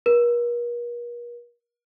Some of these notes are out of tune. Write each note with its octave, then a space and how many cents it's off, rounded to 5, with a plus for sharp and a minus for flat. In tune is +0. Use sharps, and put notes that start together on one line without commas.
A#4 +45